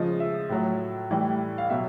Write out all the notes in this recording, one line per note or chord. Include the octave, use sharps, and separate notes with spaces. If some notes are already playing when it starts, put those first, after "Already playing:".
Already playing: C#3 F3 G#3 D#5
E5
A2 F#3
A2 E3 G3
F5
B2 F#3 E5